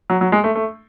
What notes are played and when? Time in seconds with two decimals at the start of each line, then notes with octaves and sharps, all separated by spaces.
0.10 F#3
0.21 F#3
0.32 G#3
0.44 A3
0.55 A3